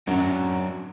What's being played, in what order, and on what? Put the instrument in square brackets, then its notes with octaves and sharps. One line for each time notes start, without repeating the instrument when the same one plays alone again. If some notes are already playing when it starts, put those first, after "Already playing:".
[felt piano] F#2 [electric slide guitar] F#3 D4 F#4